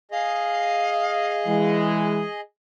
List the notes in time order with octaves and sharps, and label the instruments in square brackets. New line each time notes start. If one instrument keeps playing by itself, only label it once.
[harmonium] G#4 D#5 [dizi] F5
[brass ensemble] E3 G#3